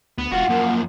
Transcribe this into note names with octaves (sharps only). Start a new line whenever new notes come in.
D2 B3
E1 F4 F#4 F#5
F#2 F3 A#3